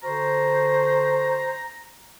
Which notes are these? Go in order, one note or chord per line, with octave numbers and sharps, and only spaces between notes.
D3 F#4 C5 A#5